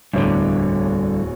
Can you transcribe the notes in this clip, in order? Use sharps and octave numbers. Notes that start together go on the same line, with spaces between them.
D1 E2 G2 D3 C#5